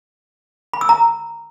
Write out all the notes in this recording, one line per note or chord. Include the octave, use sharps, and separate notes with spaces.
B5
E6
A#5